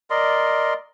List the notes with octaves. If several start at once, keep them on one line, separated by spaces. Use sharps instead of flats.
A#4 D5 D#5 C6